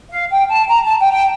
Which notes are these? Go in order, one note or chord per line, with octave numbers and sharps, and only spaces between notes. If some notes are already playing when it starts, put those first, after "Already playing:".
F5
G5
A5
A#5
A5
G5
G5